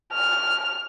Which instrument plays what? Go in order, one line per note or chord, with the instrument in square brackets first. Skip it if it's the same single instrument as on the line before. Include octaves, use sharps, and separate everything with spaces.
[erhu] F6